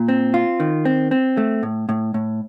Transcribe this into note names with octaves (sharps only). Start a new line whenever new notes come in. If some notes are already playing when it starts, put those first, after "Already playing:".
Already playing: A#2
C4
F4
D#3
C4
C4
A3
A2
A2
A2